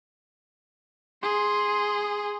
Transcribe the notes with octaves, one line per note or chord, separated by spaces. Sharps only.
G#4 C6